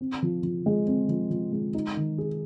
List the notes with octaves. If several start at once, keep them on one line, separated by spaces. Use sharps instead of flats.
C4
F3
F3
G#3
C4
F3
F3
G#3
D#4
D#3
G#4